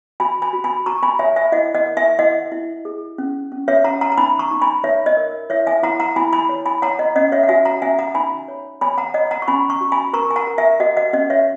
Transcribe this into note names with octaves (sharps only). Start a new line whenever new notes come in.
F#4 G#5 B5
G#5 B5
F#4
G#5 B5
F#4 A#5 C#6
G#5 B5
C#5 E5 G#5
E5 G#5
E4 D#5 F#5
D#5 F#5
A#4
E5 G#5
E4 D#5 F#5
E4
G#4
C#4
C#4
C#5 E5
C#4 F#5 A#5
F#5 A#5
A#5
D#4 G#5 B5
A#5 C#6
D#4
G#5 B5
D#4 C#5 E5
D#5
A#4
E4 C#5 E5
E5 G#5
E4 F#5 A#5
F#5 A#5
E4 G#5 B5
G#5 B5
C#5
G#5 B5
C#5 F#5 A#5
D#5 F#5
C#4 D#5 F#5
C#5 E5
F#5
F#4 E5 G#5
F#5 A#5
C#4 E5 G#5
F#5 A#5
D#4 G#5 B5
C#5
C#5 G#5 B5
F#5 A#5
C#5 D#5 F#5
F#5 A#5
C#6
C#4 G#5 B5
A#5 C#6
F#4
G#5 B5
A#4 A#5 C#6
G#5
F#5 A#5
A#4
E5 G#5
F#4 D#5 F#5
D#5 F#5
C#4 D#5 F#5
C#5 E5